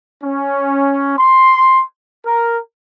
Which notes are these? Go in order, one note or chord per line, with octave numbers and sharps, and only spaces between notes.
C#4
C6
A#4